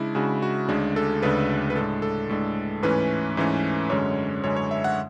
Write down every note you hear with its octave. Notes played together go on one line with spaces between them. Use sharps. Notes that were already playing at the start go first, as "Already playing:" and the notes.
Already playing: C#3 G#3 D4 E4
C#3 G#3 D4 F#4
F#4
D2 C#3 G#3 D4 G#4
A4
D2 C#3 G#3 D4 B4
B4
A2 G#3 D4 A4
A4
A2 G#3 D4
G#2 E3 A3 C#4 B4
G#2 E3 A3 C#4
F#2 D3 G#3 C#4 C#5
F#2 D3 G#3 C#4 C#5
C#5
E5
F#5